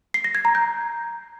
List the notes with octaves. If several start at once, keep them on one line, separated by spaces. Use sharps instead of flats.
C7
A#6
G#6
A#5
G6